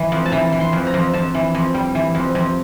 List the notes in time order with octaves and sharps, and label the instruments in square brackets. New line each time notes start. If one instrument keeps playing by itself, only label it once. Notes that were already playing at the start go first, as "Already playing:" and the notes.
Already playing: [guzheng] E3
F2
A5
E3 A#5
E3
C6
F2
A#5
F2
F2 A5
E3
F2
G3
E3
F2
F2